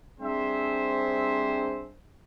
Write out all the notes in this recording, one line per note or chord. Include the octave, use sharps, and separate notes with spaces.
G3 C4 D4 G#4 C5 E5